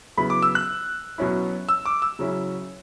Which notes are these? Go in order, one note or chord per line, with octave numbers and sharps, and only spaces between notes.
C#3 F#3 B3 E4 B5
D6
E6
F#6
B2 F#3 C#4 E4
E6
D6
E6
C#3 F#3 C#4 E4